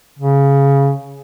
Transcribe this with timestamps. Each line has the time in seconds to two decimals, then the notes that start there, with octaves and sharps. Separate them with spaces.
0.19 C#3